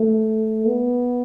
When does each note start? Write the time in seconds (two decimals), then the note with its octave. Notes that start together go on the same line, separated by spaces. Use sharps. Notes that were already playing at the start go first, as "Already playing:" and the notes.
Already playing: A3
0.67 B3